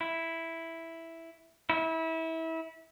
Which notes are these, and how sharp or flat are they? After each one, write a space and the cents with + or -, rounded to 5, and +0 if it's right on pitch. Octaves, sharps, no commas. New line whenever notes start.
E4 +0
E4 -25